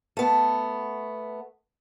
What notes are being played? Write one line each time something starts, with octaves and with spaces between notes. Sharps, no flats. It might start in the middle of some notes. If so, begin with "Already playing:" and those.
A3 B3